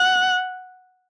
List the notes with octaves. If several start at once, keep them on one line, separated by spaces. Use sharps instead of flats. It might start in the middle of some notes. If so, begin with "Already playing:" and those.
Already playing: F#5